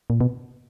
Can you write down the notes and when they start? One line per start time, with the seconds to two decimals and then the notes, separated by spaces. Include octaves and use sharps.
0.10 A#2
0.21 B2